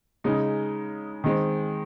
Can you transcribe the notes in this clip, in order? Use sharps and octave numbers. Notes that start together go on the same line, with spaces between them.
C#3 G#3 D#4
D#3 G#3 C4